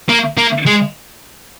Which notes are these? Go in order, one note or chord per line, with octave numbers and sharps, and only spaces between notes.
A#3
A#3
G#3